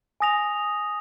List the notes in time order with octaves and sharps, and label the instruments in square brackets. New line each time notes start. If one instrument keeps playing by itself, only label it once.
[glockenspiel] G#5 D#6 A#6 F7